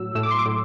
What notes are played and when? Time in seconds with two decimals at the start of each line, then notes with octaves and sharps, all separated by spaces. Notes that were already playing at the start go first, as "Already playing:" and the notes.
Already playing: A2 F#3 E6
0.15 A2 E6
0.23 D6
0.31 C6
0.39 D6
0.46 A2